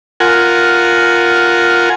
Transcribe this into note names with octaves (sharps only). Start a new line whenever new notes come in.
F4 A#4 F#5 G#5